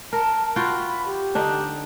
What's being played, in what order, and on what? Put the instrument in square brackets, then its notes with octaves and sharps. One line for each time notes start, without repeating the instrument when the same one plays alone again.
[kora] A#4 [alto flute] A5
[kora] F4 F#4 G5 [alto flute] B5
[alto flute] G4
[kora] D3 D4 D#4